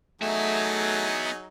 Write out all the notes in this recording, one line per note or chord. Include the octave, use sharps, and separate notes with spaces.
F#3 A3 B3 D#4 G#4 E5